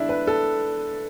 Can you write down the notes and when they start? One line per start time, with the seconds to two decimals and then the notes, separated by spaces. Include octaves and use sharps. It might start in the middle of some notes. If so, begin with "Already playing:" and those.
Already playing: D3 G#3 B3 D4 E4
0.09 B4
0.27 A4